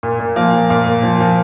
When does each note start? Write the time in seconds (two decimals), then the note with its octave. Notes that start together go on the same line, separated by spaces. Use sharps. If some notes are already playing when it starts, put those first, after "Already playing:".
0.03 A#2
0.20 A#2
0.36 F3 A#3
0.53 F3
0.70 A#2 A#3
0.86 A#2
1.03 F3
1.20 F3